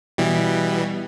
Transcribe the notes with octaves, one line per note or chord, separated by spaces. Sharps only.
B2 E3 G3